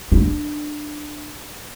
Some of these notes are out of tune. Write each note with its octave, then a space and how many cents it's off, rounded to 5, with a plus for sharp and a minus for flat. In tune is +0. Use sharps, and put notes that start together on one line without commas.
D4 +20